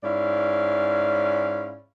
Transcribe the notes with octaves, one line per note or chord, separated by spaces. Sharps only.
G#2 C#4 E4 D5 F5